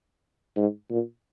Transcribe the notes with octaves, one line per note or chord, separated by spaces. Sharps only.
G#2
A#2